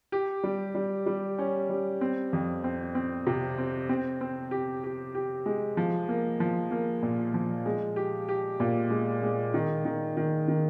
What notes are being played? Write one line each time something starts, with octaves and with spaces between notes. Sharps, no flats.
G4
G3
G3
G3
C#4
G3
C4
F2
C4
C4
C3
C4
C4
C4
G4
G4
G4
G#3
F3
A#3
F3
A#3
A#2
F3
G#3
G4
G4
A#2
G#3
G#3
D#3
D#3
D#3
D#3